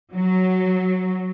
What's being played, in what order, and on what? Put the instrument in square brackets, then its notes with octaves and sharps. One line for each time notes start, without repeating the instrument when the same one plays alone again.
[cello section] F#3